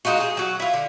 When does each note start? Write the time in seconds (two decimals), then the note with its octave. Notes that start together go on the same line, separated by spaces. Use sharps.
0.05 G#3 D#4 F4 F#4
0.20 G#4
0.37 F#3 F#4
0.60 E4 F4
0.74 D3